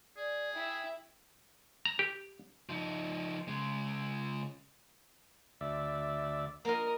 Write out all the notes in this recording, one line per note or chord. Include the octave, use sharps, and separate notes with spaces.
G#4 D5
E4 E5 G5
A#5
G4
F3 D#4
C#3 G#3
D2 D5 E5
A#3 F4 A#4 D#5